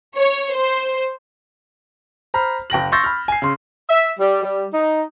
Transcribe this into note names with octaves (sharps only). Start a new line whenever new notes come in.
C#5
C5
C5 A#5 B5 F6
F#1 G5 A#6 F#7
C6 C#6 E6 G6 A6 A#6
B5 F6
G#5 C7
C#3 C6
E5
G3
G3
D#4